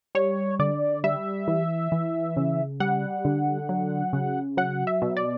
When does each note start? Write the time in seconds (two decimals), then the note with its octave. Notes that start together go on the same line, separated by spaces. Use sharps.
0.15 G3 C#5
0.59 D3 D5
1.04 G3 E5
1.48 E3
1.92 E3
2.37 C#3
2.80 G3 F#5
3.25 D3
3.69 F#3
4.13 C#3
4.57 F#3 F#5
4.87 E5
5.02 B2
5.17 D5